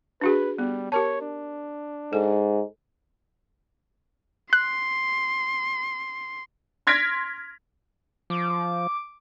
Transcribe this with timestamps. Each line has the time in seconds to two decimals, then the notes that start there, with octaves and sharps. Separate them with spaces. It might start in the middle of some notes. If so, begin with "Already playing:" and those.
0.21 D4 F#4 G#4 B4
0.58 G3 B3
0.92 G4 A#4 C#5 A5
1.21 D4
2.13 G#2 A4
4.53 C6 F#6
6.87 C6 F6 G#6 A#6 B6 D7
8.30 F3 D6